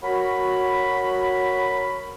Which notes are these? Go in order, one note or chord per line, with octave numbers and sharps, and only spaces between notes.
F#3 F#4 A#4 B5